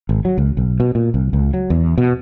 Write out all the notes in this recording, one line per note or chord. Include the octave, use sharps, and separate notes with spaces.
G#1
F#3
C#2
B1
B2
A#2
C2
C#2
F#3
E2
B2